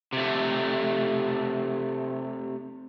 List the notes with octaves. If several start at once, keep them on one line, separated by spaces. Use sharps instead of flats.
C3 A3